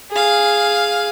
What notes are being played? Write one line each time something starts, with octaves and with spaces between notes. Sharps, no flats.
G#4 F5